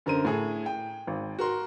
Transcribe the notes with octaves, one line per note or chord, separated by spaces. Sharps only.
F#2 D3 A#4 C5 D#7
A2 G#4
G5
G#1
F#4 A#4 C6